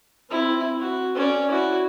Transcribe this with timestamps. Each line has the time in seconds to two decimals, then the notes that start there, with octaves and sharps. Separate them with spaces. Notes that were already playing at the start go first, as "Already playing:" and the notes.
0.29 C4 E4
0.80 F#4
1.15 C#4 D5
1.50 E4 F#4